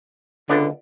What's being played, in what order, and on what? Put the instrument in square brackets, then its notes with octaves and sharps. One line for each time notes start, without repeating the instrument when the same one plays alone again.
[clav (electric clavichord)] C#2 B3 D5 [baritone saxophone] D3